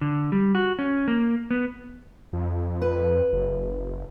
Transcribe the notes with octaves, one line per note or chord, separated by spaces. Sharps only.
D3
G3
F#4
C#4
A#3
B3
F2
B4
F#1